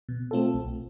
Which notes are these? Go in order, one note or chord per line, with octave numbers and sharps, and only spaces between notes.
B2
A3 C4 F4 A4
B1